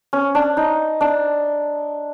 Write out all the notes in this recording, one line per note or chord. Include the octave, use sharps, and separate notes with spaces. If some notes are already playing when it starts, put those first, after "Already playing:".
C#4
D4
D#4
D4